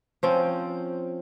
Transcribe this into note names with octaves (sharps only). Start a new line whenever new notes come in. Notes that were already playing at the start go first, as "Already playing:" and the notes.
F3 C4 C#4